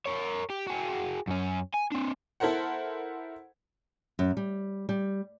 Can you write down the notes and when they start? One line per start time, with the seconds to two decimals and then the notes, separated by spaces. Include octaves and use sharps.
0.06 A#4 C#5
0.50 G4
0.67 F#4 G#4
1.28 F#2 C#4
1.74 G#5
1.92 C4 D4
2.40 E4 A4 A#4 C5 F#5
4.19 F#2
4.37 G3
4.89 G3